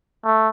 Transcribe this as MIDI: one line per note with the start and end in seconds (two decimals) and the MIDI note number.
0.25 0.49 57